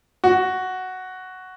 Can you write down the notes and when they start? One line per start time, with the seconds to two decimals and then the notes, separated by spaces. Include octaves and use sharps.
0.24 F#4